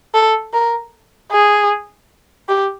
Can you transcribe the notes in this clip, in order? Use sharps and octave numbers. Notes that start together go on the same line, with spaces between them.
A4
A#4
G#4
G4